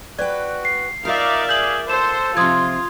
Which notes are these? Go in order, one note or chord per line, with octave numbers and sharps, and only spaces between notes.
F#4 B4 D5 G5
C7
D#4 F4 A#4 D5 E5 F5
G#4 G6 F#7
A4 C5 E7
C3 F3 F4 C6 D#6 G#6